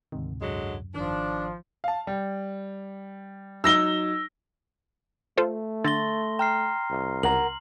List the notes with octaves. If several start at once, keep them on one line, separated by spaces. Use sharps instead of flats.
D2 G#2 C3 D#3
F#2 D3 F#3 G#3
G#1 D#3 F3 D4
F5 A5
G3
F#3 D#4 E6 A#6 G7
A3 F4 A4 C5
D3 C6 A6 A#6 G7
G5 A#5 F6 C7
C2
C#2 A#4 F#5 A#5 F#7